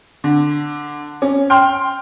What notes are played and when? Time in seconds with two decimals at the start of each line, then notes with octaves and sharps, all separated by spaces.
0.24 D3
1.22 C#4
1.50 G5 C6 F6